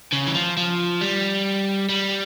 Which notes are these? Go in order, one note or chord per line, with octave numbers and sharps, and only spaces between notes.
C#3
E3
F3
F3
G3
G3